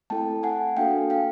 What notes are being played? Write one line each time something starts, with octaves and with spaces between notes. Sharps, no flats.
A3 C4 E4 A4 G5 A5
F#5 G#5
A#3 D4 F#4 A4 F5 G5
F5 G5